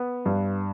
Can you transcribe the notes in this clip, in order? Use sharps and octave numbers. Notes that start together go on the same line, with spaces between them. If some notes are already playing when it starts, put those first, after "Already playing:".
Already playing: B3
G2